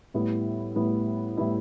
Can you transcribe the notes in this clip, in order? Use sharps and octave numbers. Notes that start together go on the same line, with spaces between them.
A2 G3 B3 E4
A2 G3 B3 E4
A2 G3 B3 E4